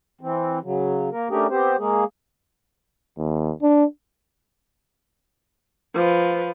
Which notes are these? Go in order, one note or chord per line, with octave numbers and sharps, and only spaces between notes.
E3 C4
C#3 F#3
A#3 A#4
A3 C#4 D4 G4 G#4 A#4
B3 C4 G4 C5
G#3 A#3 G#4
D#2
D4
F3 B4